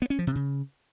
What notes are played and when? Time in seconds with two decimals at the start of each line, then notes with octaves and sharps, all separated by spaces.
0.02 B3
0.10 C#4
0.19 F3
0.27 C3
0.35 C#3